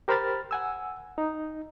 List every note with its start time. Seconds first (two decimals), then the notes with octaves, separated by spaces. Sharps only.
0.08 G4 A#4 C5 B5 F6 A6
0.51 F#5 G#5 E6
1.18 D#4